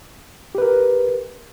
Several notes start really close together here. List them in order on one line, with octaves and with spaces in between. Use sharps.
G4 B4 A#4